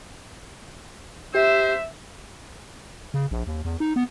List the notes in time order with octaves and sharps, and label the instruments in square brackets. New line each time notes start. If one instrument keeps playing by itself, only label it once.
[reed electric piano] G4 [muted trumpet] C5 [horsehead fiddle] E5
[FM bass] C#3
A#1
D#2
E2
D#4
B3